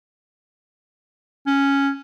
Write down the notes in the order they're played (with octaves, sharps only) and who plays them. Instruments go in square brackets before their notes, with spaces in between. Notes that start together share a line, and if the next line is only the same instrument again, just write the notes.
[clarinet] C#4